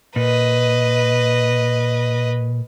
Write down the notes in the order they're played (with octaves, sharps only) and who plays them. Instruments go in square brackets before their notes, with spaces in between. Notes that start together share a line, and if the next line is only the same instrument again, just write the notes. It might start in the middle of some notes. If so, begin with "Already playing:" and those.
[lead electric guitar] A#2 [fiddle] B4 D#5